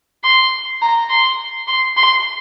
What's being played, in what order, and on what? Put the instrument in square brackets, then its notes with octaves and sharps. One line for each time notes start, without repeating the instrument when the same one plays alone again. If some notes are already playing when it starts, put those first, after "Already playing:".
[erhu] C6
A#5
C6
C6
C6